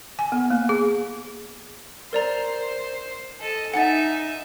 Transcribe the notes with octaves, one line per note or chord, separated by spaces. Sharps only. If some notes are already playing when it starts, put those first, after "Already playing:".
G#5
B3
A#3
G#4
A#4 C5 D5 A#5
A4 D#5
D#4 E5 F#5 G#5 A6